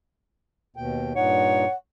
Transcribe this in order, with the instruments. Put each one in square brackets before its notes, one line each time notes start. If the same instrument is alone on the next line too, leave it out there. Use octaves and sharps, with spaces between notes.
[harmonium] D#2 B2 G5
[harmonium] G2 A#2 D#4 [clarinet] C#5 [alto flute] F#5